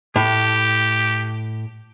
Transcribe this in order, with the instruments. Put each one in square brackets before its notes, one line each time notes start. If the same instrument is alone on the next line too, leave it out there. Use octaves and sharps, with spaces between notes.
[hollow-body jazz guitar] A2 [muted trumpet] G4